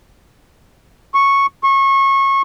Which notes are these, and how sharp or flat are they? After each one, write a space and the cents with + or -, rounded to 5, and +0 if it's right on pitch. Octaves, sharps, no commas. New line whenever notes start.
C#6 -5
C#6 -25